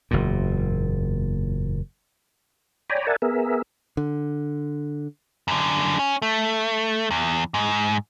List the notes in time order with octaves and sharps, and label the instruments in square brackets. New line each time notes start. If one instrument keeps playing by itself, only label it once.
[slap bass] F#1 E2 A#2
[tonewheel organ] C#5 D5 G5 G#5 A#5 B5
A#4 D5 E5 F#5 G#5 A5
B3 G#4 A#4 E5
[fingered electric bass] D3
[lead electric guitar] F#2 D3
C#4
A3
E2
G#2